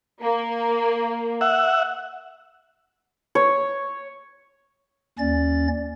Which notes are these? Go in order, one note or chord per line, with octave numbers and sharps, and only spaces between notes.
A#3
E5 F#5
C#5
D#2 C#4 D5 A6